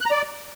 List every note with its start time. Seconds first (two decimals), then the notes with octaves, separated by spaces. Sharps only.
0.01 F#6
0.06 A#5
0.11 D5